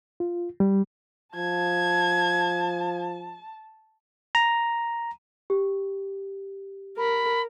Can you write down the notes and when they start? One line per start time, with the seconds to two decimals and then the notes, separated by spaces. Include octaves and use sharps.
0.20 F4
0.60 G3
1.36 F3 A5 G#6
4.35 A#5
5.50 G4
6.98 A#4 B5